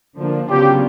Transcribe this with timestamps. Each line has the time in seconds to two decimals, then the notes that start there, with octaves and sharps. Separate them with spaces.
0.18 D3 F3 A#3 D4
0.48 C#3 F#3 B3 D4 F4 G4